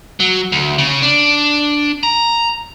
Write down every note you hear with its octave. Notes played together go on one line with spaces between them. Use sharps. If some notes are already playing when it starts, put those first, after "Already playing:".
F#3
D2
C#3
D4
A#5